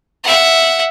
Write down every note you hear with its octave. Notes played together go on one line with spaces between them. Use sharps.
E5 F#5